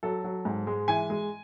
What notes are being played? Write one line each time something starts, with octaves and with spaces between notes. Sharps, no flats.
F#3 A4
F#3
G#2
G#3
E3 G#5
G#3